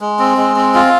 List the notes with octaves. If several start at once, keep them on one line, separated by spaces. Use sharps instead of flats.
G#3
C4
G#3
C4
F4